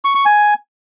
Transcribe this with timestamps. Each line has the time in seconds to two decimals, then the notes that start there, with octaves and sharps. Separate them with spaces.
0.05 C#6
0.15 C#6
0.25 G#5